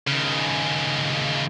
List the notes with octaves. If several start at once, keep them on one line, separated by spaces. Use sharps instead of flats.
D#2 C#3